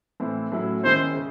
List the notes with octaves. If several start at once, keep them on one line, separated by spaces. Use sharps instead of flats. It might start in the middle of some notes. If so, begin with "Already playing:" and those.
A2 E3 C4 E4
A2 F#3 C#4 E4
G#2 D#3 G#3 C#4 E4 C5
C#3